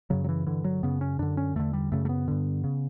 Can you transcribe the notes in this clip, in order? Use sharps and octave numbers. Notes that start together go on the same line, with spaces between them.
F#2 C#3 F#3
F#3
E3
G2 D3 E3
F#3
F#2 C#3 B3
C#4
F#2 D3 D4
C#4
E2 D3 A3
G3
F#2 C#3 A3
A3
B3
G2 D3
C#3